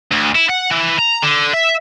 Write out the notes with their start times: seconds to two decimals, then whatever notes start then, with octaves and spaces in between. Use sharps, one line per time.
0.12 D2
0.35 E4
0.50 F#5
0.71 E3
0.98 A#5
1.22 D3
1.54 E5